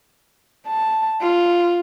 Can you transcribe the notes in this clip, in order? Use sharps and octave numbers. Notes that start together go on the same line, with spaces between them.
A5
F4